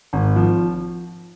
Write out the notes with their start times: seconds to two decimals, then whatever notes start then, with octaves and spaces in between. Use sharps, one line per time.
0.13 G#1
0.36 F3